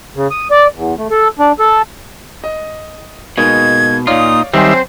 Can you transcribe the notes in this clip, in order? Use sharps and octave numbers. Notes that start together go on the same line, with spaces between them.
C#3
D#6
D5
E2
A3
A4
D4
A4
D#5
B2 G#3 A#3 D#4 G#6
A#2 D#4 F4 C#5 D5 F5 D#6
D#3 F#3 G3 C4 C5 E5 G#5